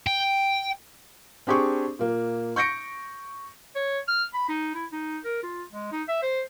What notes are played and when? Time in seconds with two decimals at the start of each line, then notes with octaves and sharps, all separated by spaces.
0.07 G5
1.47 C4 D4 G4 G#4 C#6
1.99 A#2 A#3
2.56 C#6 G6 A#6 C#7 D7
3.75 C#5
4.08 F6
4.34 B5
4.49 D#4
4.75 E4
4.92 D#4
5.25 A#4
5.43 F4
5.73 G#3
5.92 D#4
6.09 E5
6.22 C5